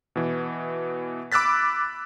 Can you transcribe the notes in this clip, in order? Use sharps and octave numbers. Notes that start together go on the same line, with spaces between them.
B2 E3
B5 D6 E6 F#6 A6 B6